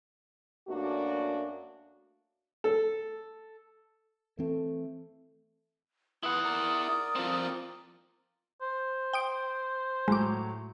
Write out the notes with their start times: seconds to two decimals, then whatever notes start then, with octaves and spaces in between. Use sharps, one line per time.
0.68 F#2 A3 A#3 D4 F#4
2.64 A4
4.39 E3 A3 C4
6.23 B3 E4 F#5 C6 D#6
6.45 A#4 D5
7.16 F3 C4
8.62 C5
9.13 G5 D#6 D7
10.08 A2 F#3 G#3 D6